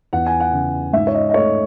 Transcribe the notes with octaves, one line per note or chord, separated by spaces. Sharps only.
E2 F#5
G#5
F#5
C#3
G#2 E5
C#5
D#5
D#5
A3 C#5